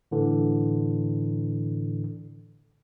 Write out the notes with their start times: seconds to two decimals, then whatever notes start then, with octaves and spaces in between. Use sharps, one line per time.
0.11 A2 D3 E3